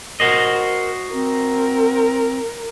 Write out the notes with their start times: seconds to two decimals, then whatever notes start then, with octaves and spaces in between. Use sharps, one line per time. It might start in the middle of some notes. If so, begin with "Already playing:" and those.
0.20 F#4 A#4 C5 D#5
1.13 C4 A#4